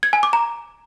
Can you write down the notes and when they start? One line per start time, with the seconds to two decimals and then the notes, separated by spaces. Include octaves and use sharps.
0.03 G#6
0.13 G#5
0.23 D6
0.33 A#5